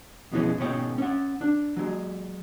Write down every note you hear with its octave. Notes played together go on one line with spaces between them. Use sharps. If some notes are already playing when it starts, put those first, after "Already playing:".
F2 B2 E3 G#3 C#4
G#2 B2 C#4 C#5 G5
C#4 F#5
D4
F#3 G#3